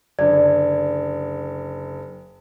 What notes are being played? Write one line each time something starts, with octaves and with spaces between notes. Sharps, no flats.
F#1 D3 D5